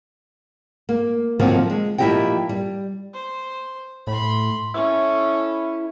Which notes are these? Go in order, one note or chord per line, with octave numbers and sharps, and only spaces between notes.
A#3
D3 D#3 F3 F#3 A#3 C4
G#3
A#2 F3 E4 G4 D#5 G5
G3
C5
A2 B5 C6
C#4 E4 A4